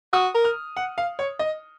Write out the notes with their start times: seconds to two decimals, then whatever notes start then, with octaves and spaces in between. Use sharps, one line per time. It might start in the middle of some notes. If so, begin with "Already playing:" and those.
0.13 F#4 D#6
0.35 A#4
0.45 F6
0.77 F#5
0.98 F5
1.19 C#5
1.39 D#5